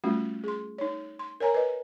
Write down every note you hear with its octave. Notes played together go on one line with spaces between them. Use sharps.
G3 A3 C#4 F4 F#4
G#4 C6
D#4 C#5
C6
A#4 C#5 G#5 A#5
B4 D#5